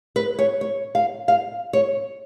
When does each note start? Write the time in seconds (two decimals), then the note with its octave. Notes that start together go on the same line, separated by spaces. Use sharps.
0.16 B4
0.39 C#5
0.61 C#5
0.95 F5
1.28 F5
1.73 C#5